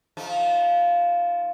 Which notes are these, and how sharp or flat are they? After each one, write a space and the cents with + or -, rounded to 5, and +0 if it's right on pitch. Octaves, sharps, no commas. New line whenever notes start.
F3 +0 A3 -35 D#4 +0